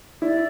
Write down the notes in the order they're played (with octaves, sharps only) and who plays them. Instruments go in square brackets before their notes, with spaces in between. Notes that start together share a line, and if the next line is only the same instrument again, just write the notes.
[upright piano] E4 [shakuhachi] D5